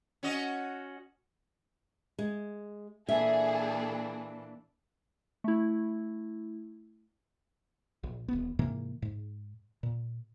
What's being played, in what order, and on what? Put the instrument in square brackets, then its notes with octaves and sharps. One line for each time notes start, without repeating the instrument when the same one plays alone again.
[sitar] C#4 F#4 D#5
[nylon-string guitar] G#3
[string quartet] A#2 E3 D4 [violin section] G#4 A4 [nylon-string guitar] E5
[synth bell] A3 E4
[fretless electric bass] A#1
D#1 B3
G#2 C3 E3 A#3
G#2
A#2